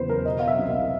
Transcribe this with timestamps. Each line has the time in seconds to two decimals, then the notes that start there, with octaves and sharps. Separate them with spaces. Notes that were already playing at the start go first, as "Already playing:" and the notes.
Already playing: E2 C#3 B4 C5
0.09 A#4
0.25 B2 D#5
0.39 F5
0.48 E5
0.59 C2
0.70 F5